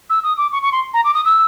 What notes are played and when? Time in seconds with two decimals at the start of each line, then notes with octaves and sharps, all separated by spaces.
0.09 E6
0.23 D#6
0.37 D6
0.52 C#6
0.62 C#6
0.72 C6
0.93 A#5
1.04 D6
1.14 D#6
1.25 E6